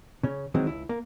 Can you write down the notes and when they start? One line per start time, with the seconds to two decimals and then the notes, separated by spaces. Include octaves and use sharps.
0.23 C#3 C#4
0.54 D#3 E3 F#3 G#3 C4
0.67 C#2 E4
0.89 A#3